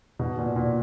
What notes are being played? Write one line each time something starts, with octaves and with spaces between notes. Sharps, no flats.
B2
A#2
A#2